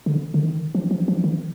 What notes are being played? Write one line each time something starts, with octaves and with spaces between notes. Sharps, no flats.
D3
D3
D#3
F3
F3
F3
D#3